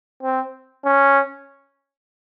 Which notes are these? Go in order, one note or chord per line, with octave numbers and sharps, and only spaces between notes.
C4
C#4